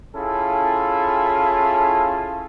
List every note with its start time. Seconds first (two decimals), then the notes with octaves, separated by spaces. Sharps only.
0.16 C#4 E4 F4 G#4 A4